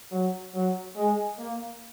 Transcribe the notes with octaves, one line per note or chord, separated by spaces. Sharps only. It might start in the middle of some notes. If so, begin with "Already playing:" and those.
F#3
F#3
G#3
A#3